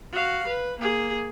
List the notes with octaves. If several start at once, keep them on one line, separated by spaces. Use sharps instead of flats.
F#4 F5
B4
A#3 G#4